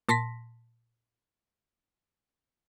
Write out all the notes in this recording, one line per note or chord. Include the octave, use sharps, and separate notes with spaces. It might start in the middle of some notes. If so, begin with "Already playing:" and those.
A#2 A5 C6 A#6 B6